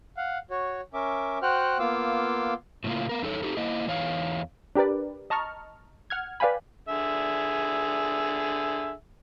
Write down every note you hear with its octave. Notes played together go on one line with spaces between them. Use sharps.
F5 F#5
F#4 C#5
C#4 A#4 E5 D6
F#4 C5 F#5 G5 F6 F#6
A#3 B3 F4 F5 D6 E6
A2 C#3 A3 A#3 F4
B3 A#4
E2 D#4 A4 C#5
D#4 G4 A4
A#3 E4 D#5
E2 E3 C#5 F5
D4 G4 A#4 B4 D5
D#5 A5 A#5 C#6 F6
F#5 F6 G#6
B4 D5 F5 G5 G#5 B5
D3 G#4 E5